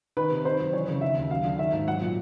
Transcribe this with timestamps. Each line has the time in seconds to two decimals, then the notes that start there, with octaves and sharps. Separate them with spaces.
0.17 D#3 B4
0.31 C3
0.45 D#3 C5
0.60 F#2
0.73 E3 C#5
0.88 C#3
1.01 D#3 E5
1.16 D#2
1.30 F#3 F5
1.45 D3
1.59 D#3 E5
1.72 G#2
1.87 F#3 F#5
2.01 A#2